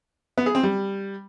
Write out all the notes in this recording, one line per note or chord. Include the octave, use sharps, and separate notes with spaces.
B3
G#4
C4
G3